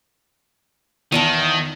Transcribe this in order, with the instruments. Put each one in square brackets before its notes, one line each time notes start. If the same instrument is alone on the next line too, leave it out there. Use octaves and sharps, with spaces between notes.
[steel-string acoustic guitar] E2 F#5 A5 [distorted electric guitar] D#3